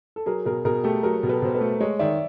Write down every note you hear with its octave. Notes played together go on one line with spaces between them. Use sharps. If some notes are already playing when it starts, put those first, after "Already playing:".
A4
F#3 G#4 A#4
B2 G#4 A#4
B2 G#4 A#4
A3 G4 A4
F#3 G#4 A#4
B2
A4 B4
B2 C5
A4 B4
A3
G#3 C#5 D#5
D#3 D5 E5